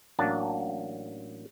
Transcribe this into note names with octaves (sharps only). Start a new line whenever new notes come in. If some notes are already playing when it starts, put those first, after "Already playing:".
A1 F#3 A#3 D4 A5